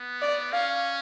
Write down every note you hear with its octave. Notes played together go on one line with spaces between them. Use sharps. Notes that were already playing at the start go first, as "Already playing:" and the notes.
Already playing: B3
D5
C#4 F5